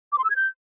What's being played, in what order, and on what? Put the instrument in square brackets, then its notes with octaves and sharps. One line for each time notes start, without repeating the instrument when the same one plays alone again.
[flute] D6
C6
E6
G#6
G6